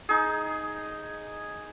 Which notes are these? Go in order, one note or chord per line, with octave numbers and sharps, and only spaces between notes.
D#4 G#4